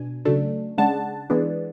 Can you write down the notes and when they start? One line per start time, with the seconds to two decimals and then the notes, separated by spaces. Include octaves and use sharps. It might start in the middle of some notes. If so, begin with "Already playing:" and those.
Already playing: B2 D4 G#5
0.25 C#3 F#3 A3 D4
0.78 C#3 G#3 D4 F#5 A5
1.30 E3 G#3 B3 D4